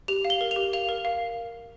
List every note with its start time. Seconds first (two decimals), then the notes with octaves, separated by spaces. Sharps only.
0.08 G4 F7
0.25 F5
0.30 G7
0.41 A#4
0.51 F7
0.56 G4
0.73 F5 F7
0.89 A#4
1.05 F5